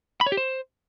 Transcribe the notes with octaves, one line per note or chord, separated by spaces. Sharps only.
B5
C#5
G4
C5